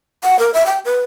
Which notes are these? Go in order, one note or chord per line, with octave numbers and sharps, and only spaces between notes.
F#5
A#4
E5
G5
B4